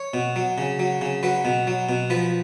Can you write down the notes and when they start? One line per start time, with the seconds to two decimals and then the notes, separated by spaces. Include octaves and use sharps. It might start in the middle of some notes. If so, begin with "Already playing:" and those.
Already playing: C#5
0.14 B2
0.36 F#3
0.58 C#3
0.79 F#3
1.01 C#3
1.23 F#3 B4
1.45 B2
1.67 F#3
1.89 B2
2.10 F3 B4